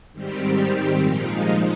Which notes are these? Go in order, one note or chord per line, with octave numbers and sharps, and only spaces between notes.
G#2 D#3 G3 C4 G4
A#2 F3 G#3 D#4